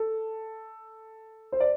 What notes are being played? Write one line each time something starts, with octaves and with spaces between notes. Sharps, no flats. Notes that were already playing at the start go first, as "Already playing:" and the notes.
Already playing: A4
C5
D5